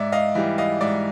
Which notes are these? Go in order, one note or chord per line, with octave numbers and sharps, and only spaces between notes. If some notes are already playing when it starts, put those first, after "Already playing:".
Already playing: G#2 D5 E5
D#5 F5
E3 G3
D#5 F5
G#2 D5 E5